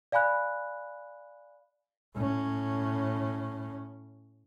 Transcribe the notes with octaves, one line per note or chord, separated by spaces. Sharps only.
D5 F5 G#5 B5 F#6
A2 C#4